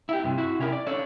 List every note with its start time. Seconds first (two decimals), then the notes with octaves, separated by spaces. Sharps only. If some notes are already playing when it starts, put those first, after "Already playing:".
0.09 E4 G4
0.24 G2 C3
0.38 E4 F#4
0.59 C3 C#4 E4 A#4
0.72 D5
0.87 C#4 D4 A4 C#5